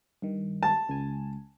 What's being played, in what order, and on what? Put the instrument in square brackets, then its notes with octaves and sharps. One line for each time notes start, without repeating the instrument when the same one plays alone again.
[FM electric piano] G2 D#3
[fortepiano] A5
[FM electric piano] C#2 G#5